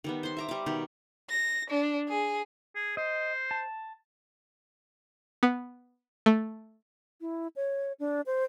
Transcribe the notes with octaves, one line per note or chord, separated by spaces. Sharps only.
D#3 G3 B3
C5 C6
E5 A#5 D6
G3 D6
B2 D#3 G4
A#6
D4
G#4
G#4
C5 D#5
A5
B3
A3
E4
C#5
D4
C5